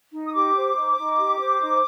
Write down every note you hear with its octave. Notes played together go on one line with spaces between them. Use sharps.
D#4
D#6
G4 D6
C5
D#4
D#4
G4
C5
D#4